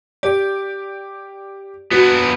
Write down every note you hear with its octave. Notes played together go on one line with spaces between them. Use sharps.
G4 D5 D7
B3 D4 F#4